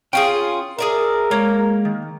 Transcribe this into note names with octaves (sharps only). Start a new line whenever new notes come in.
C#4 F4 G#4 G5
G#4 A#4 D5 E5
G#3 A#3 C#5
D#3